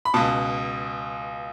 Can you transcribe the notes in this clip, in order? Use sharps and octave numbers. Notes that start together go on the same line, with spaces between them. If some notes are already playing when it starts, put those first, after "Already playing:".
B5
C#2 B2 A5